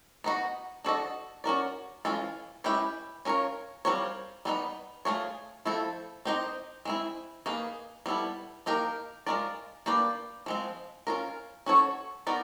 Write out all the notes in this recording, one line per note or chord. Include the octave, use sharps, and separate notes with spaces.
B3 D#4 F#4
D4 F#4 A4 C5 D#5
C#4 F#4 A#4 D5
E3 G#3 C#4 F4 A4
G#3 C#4 E4 G4 B4
C#4 F4 A#4 C#5
G3 C4 F4 A#4 C#5
G3 B3 D#4 G#4 B4
A3 D4 F4 G#4 C#5
F3 A3 C4 E4 A4
C4 D#4 G4 C5 D#5
G#3 C4 E4
A#3 D#4 G#4 B4
G3 B3 E4 A4
A#3 D#4 G4 A#4
G#3 C#4 F4 A#4 D5
A#3 D4 G4 B4 D5
F3 G#3 C4
C#4 F4 A#4
C#4 F#4 A4 C#5
B3 D#4 F#4 A#4 D5